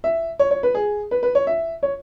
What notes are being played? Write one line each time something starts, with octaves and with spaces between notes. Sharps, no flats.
E5
C#5
C#5
B4
G#4
B4
B4
C#5
E5
C#5